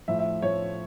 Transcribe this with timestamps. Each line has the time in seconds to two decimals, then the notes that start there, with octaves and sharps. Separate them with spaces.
0.08 A2 F3 E5
0.19 E5
0.42 A2 F3 C#5